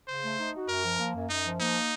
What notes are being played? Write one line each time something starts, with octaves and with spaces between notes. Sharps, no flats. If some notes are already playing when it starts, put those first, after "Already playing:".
C#3 C5
A3
D#4
F#4
F#2 A#4
F3
A#3
F#2
F#2 D#4
F3
A#3 D#4